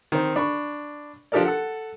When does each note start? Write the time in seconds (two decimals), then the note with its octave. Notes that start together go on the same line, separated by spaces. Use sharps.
0.12 D#3 C4 C5
0.36 D4 B5 C#6
1.32 F3 D4 G4 A4 A#4 D5
1.45 A4 F#5